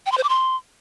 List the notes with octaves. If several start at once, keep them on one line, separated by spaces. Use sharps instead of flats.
G5
C6
C5
D6
C6